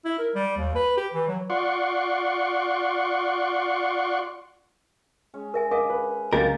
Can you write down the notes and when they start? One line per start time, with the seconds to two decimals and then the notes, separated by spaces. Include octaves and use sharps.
0.05 E4
0.18 A#4
0.35 G3
0.57 D#2
0.75 B4
0.97 G4
1.14 E3
1.28 F#3
1.50 F4 D5 F#5 C6 C#6
5.34 G#3 C#4
5.54 A#4 E5 G#5
5.71 A#4 D#5 F5 D6 D#6
5.90 B4
6.33 C#2 F#3 A#3 G4 A#4 D#5 A6